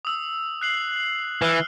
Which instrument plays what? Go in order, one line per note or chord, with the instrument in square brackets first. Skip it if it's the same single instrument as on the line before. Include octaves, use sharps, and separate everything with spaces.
[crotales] D#6 E6
F#6 C7 F#7
[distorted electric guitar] E3 [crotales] F6 F#6